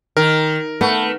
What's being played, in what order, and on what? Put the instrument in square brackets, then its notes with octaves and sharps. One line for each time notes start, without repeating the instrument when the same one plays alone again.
[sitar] D#3 [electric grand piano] A#4
[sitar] A3 [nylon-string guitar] B3